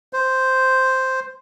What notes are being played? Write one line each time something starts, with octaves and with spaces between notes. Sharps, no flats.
C5